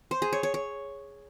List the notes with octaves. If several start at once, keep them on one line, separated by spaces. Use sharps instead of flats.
C5
G#4
C#5
C#5
C#5